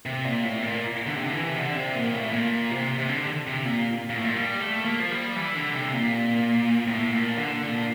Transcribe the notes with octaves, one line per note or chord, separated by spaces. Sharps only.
C3
A#2
A2
A#2
D3
C3
D3
E3
C3
D3
C3
A#2
A2
A#2
C3
C3
D3
C3
A#2
A#2
A2
A#2
G3
A3
A#3
F3
G3
E3
D3
C3
A#2
A2
A#2
D3
A#2